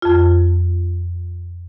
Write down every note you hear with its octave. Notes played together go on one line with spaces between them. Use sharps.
F2 F4